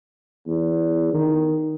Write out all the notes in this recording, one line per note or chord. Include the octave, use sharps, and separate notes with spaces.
E2
D#3